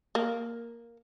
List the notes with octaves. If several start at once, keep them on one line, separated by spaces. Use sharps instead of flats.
A#3